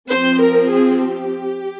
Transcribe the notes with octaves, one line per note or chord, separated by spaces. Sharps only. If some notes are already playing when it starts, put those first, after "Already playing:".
F3 C4 C5
A#4
G#4
G4